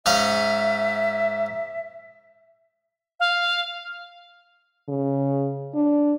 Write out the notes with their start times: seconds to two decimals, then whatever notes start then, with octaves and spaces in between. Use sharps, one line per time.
0.06 G#2 C#4 E5 F5
3.20 F5
4.89 C#3
5.74 D4